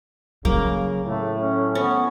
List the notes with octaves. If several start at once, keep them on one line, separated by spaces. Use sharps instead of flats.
C#3 F#3 A#3
A2 A3
C#4
B3 C#4